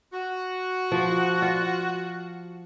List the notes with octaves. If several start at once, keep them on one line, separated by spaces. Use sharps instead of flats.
F#4
F3
F4